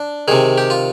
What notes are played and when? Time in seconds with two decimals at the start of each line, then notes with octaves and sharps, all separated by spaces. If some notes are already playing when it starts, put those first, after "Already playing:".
Already playing: D4
0.28 C3 D#3 G#4
0.58 G4
0.70 F4